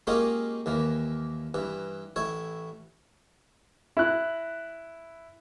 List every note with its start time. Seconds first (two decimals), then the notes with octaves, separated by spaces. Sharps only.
0.07 G#3 A#3 C#4 D#4 F4 G4
0.66 D#2 E3 A#3
1.54 G2 E3
2.16 A1 E4 C#5
3.97 E4 F#6